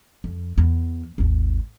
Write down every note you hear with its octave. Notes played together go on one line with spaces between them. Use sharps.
F2
E2
G#1 D#2